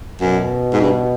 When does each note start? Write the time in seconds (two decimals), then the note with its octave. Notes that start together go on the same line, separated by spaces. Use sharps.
0.21 F#2 B2
0.73 G#2
0.80 G2